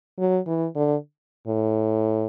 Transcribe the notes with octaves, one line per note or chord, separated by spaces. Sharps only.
F#3
E3
D3
A2